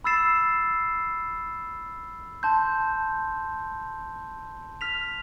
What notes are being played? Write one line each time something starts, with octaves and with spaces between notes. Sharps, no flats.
B5 E6 A6 C7 E7
A5 C6 G6
F6 B6 F7